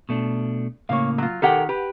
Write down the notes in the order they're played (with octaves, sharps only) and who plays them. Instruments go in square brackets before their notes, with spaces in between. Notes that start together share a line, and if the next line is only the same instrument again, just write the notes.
[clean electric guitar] B2 A3 D4
[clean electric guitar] A2 C#3 A#3 [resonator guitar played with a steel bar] C#5 F5
[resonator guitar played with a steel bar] F#3 F4
[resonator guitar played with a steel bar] D#3 G4 F#5 [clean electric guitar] A4 A#4 G5
[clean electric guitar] G4 [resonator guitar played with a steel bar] B4